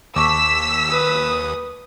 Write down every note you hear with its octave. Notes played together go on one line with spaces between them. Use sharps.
D#2 A5 C#6 D6 E6 B6
B4 D#6